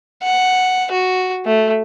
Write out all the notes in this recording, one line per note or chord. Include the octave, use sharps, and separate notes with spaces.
F#5
F#4
A3